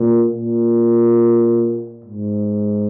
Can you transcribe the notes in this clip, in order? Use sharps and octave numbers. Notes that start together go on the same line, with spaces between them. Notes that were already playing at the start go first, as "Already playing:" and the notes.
Already playing: A#2
A#2
G#2